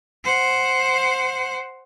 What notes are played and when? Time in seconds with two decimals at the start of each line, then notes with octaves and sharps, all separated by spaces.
0.24 C5 F#5